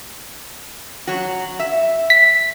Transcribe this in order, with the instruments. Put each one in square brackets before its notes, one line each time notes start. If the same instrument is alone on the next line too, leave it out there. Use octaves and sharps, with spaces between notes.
[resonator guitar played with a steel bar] F#3 F#4
E5
[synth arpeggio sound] B6